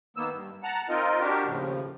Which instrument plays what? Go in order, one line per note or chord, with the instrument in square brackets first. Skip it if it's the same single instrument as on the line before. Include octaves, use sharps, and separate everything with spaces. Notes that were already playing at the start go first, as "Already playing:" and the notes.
[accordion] D#3 A#3 B3 E6
G2
F#5 A5 A#5
C4 D#4 F4 A#4 D#5
D4 F#4 G4 A#4
D#2 A2 C#3 F3